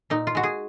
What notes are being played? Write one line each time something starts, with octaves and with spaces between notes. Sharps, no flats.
A#2 D#4
F4
G#3 F#4
G#4